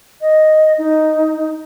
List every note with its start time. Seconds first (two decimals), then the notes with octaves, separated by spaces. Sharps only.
0.21 D#5
0.78 D#4